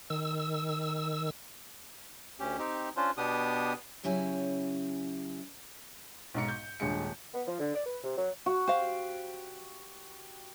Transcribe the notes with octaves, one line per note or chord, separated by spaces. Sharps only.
D#3 E6
D2 C#4 G4
C4 D#4 G4
C#4 D4 F4 C5
B2 B3 D4 G4 D#6
C#3 F#3 C#4 E4 G4 G#5
B1 G#2 C#7
G6
D#1 G2 G#3 C#7
B3
F3
D3
D5
B4
C3
F#3
F#4
G4 C5 F5